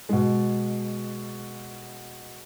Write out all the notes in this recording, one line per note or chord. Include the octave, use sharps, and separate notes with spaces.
B2 G#3